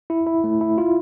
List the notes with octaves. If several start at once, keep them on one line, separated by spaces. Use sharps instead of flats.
E4
E4
A3
E4
F4